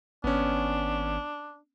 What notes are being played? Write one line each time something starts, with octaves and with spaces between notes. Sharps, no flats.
G#1 B3 C#4 D4